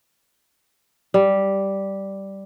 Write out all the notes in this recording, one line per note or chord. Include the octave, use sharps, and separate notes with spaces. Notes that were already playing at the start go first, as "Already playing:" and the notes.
G3